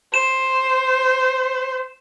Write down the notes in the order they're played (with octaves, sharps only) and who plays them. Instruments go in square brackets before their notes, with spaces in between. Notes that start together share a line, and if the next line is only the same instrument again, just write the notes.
[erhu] C5 [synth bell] E7